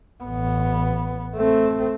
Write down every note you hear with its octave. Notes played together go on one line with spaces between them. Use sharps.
A1 B3
A3 C4